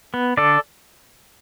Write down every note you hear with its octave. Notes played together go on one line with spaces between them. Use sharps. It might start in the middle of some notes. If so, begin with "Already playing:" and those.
B3
D3 A4 D5